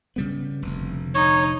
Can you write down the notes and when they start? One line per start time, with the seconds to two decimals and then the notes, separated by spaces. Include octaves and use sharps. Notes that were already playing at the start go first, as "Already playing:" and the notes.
0.16 C#3 G3 B3
0.62 F1 D2
1.15 D#4 C#5